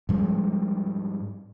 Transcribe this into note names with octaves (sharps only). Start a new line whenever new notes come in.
G#2 F3 G3 G#3